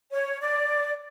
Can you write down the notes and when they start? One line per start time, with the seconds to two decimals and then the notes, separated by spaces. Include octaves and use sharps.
0.12 C#5
0.40 D5